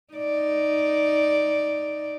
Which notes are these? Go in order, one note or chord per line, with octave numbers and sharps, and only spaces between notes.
D#4 D5